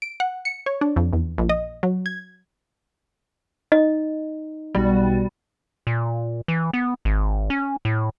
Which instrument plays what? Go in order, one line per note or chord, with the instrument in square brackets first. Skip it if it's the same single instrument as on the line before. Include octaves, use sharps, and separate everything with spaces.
[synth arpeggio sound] D7
F#5
C#7
C#5
D4
F2
E2
A#1
D#5
F#3
G#6
[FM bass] D#4 [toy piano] D#5
[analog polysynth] B1 B2 F#4 [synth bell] G3
[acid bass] A#2
E3
B3
G#1
C#4
A2